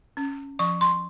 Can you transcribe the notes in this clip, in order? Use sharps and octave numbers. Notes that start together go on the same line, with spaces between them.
C#4
F3 C#6
C6